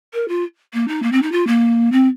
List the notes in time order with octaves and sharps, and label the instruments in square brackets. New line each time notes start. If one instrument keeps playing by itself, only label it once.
[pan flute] A#4
F4
A#3
D#4
A#3
C4
D#4
F4
A#3
C4